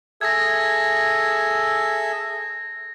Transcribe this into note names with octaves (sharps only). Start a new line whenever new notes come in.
G#4 A4 E5 G#6 A#6